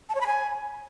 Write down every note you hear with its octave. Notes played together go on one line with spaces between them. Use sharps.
A5
C#5
B5
G#5